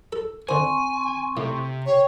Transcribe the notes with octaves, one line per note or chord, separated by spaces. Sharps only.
A4
D3 C4 C5 G#5 C6 C#6
A2 C3
C5 C#5 G5 C#6